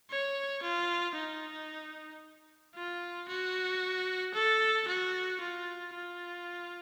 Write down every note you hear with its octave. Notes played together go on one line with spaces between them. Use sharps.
C#5
F4
D#4
F4
F#4
A4
F#4
F4
F4